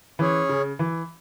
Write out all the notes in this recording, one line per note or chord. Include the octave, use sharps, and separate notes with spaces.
E3 C#4 G#4 C#5
C#3
E3